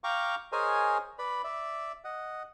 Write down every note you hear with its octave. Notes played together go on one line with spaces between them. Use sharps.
F5 G5 A#5 C#6 D6
G#4 A#4 C5 C#5 D#5 G#5
B4 D5 B5
D5 E5
D#5 F#5